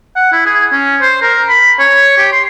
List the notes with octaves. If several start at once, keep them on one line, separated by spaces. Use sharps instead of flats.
F#5
E4
G#4
C#4
C5
A#4
B5
C#5
G4
C6